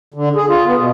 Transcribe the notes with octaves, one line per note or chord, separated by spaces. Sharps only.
D3
G#4
F4
B3
B2